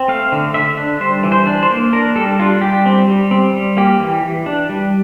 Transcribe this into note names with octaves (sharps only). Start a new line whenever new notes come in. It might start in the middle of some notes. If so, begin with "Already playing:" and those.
Already playing: C4
A3 F5
D3
D3 E5
D4
G3 C5
E3
C5
D4
C5
A#3
D4 A#4
G3 A4
D4 F4
G3 G4
C4
G3
C4
G3
A#3 G4
E3
E3
D4
G3